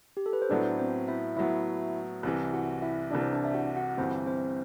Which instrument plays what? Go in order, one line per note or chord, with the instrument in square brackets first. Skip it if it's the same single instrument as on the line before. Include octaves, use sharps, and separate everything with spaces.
[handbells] G4
A4
B4
C5
[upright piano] A2 F#3 B3 [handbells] D4 D5
[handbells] C4 C5
E4 E5
[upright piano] A2 F#3 B3 [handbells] E4 E5
[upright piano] C2 C3 E3
[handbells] F#4 F#5
E4 E5
[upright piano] C2 C3 E3 [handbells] D4 D5
[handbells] C5
D4 D5
E5
F#4 F#5
F#4 F#5
[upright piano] G1 G2 E3 [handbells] C4 C5
[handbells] C4 C5